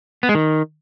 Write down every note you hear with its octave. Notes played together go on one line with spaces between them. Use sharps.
B3
G#3
D#3